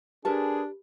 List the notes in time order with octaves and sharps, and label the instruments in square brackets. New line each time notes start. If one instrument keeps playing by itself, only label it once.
[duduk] D4 [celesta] G4 [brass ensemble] G#4 [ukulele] A#4 B4 A5